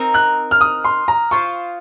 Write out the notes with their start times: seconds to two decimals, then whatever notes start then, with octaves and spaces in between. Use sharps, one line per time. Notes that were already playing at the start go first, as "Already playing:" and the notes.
Already playing: C4 D#4 A#4
0.14 F#6
0.51 F6
0.61 D#6
0.84 C6
1.08 A#5
1.31 F4 C5 F5 C#6